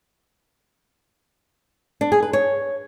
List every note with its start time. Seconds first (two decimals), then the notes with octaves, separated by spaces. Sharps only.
2.01 D4
2.12 G#4
2.23 B4
2.33 C#5